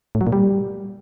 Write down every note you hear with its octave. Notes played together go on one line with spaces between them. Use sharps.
A2
F#3
A#2
G3